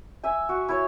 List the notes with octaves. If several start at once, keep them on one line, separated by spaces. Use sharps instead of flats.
E5 G#5
F#4
E4 C#5